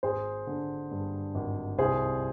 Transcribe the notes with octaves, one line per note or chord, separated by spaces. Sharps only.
G#1 G#4 C5
D3
G2
G#1
C2 G#4 C5